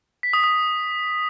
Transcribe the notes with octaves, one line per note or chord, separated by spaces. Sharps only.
B6
D#6
D#6